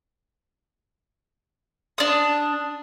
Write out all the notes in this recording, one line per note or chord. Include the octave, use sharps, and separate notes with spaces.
D4 D#6